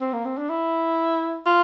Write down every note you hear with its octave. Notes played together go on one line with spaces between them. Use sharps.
C4
A#3
C4
D4
E4
F4